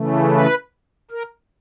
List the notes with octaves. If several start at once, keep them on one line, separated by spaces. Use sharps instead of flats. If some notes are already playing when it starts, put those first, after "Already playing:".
Already playing: C#3 E3 A3
B4
A#4